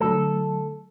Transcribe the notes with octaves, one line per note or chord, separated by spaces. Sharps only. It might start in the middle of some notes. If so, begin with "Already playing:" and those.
D3 F#3 A3 A4